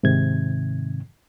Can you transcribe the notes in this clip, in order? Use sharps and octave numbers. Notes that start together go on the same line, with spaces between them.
G#2 C3 D#3 G#6